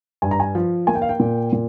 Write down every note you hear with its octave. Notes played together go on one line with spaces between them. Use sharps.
G2 G#5
A#5
G#5
F3
A#3 G#5
G5
F5
G5
A#2
A#2